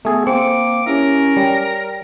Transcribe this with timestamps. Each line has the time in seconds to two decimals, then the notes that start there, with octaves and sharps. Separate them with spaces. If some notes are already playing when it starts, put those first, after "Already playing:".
0.05 A3 B3 G#4 A4
0.27 A#3 C4 D6 C#7
0.86 C#4 E4 G4 A#4 C#5 E5
1.37 G3 C#5 G5